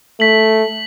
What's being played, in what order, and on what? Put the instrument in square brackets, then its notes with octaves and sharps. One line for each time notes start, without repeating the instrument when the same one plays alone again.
[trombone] A3 [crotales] B6 F#7